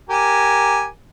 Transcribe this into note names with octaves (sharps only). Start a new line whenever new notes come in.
G4 A#4 G#5